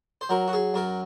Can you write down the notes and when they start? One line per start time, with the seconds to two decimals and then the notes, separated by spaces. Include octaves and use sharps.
0.21 C5
0.29 F#3 A#4
0.48 F#4
0.53 G#4
0.74 F#2 A#4